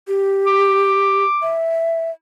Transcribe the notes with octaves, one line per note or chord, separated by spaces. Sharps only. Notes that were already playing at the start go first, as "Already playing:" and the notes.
G4
D6
E5